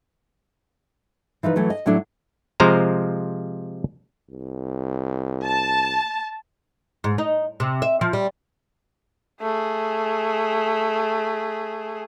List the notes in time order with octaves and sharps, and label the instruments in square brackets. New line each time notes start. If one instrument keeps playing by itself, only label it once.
[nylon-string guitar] E3 F3 D#4 B4
E3 F#3 A3
D#5
A2 F#3 A3 D4 E4
[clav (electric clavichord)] C3 F3 G#3 C5 F5 A#5
[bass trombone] C2
[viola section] A5
[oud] G#2
D#4
C3
E5
F3
G3
[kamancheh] A3 G#4